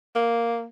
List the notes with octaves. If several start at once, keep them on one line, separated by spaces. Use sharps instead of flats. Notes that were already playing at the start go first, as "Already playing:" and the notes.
A#3